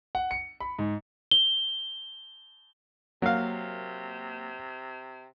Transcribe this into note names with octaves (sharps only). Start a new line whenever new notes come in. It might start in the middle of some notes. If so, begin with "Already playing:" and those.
F#5
C#7
B5
G#2
G7
C3 F#3 A#3 F5